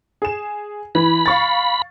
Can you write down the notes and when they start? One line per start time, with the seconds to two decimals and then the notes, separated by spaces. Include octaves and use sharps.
0.22 G#4 E7
0.95 E3 B5
1.26 F5 C#6 A6